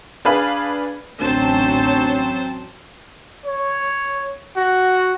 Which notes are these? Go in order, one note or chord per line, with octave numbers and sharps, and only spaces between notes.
D4 G#4 B4 F5 B5
A1 D2 F#3 C4 C#4 C5 A5
C#5
F#4